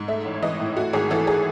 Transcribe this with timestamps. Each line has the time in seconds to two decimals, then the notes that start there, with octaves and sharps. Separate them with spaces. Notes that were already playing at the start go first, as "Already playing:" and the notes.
Already playing: G#2
0.08 A3 E5
0.25 A1
0.34 C#5
0.42 E3 D#5
0.59 A2
0.76 A3 F#4
0.93 G#1 G#4
1.11 E3 A4
1.27 G#4